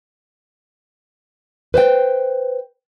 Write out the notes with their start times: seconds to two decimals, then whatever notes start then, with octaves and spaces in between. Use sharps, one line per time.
1.74 B4 C5 D#5 G5